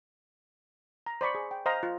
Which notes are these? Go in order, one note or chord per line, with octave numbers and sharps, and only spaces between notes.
A#5
C5 D5 B5 C#6
G#4
G5
C5 D#5 F5 A#5
F4